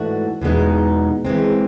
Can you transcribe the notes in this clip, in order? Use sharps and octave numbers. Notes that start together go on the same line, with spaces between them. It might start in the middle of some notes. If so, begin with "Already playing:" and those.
Already playing: G#2 E3 A3 D4 F#4
E2 B2 G#3 B3 D#4
E3 G#3 C4